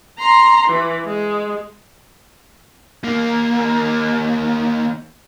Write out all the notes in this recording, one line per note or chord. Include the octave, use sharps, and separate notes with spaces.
A#5 C6
E3
G#3
D#2 A#3